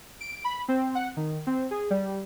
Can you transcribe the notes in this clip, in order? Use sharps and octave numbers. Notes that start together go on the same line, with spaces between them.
D7
B5
C4
F#5
D#3
C4
G#4
G3